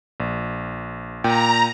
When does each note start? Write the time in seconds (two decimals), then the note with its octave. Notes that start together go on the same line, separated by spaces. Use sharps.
0.20 A#1
1.24 A#2 G5 A#5